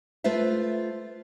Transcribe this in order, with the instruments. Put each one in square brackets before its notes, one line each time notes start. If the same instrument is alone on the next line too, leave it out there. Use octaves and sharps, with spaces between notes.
[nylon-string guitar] A3 F4 B4 C5 E5